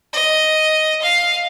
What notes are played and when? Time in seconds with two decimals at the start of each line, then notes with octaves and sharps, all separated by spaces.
0.13 D#5
1.02 F5